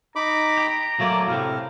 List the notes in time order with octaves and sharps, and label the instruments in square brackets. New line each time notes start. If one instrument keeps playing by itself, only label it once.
[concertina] D#4 B5 D6 [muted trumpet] A#5
[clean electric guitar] G4
[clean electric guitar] F#3 A3 D5 [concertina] A#3
[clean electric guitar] A2 C3 A3 [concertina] F5